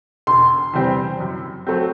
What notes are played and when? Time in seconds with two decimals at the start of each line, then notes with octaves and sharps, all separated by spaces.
0.27 E1 C6
0.73 E2 C3 G3 C4
1.20 F#2
1.67 F#3 A3 C4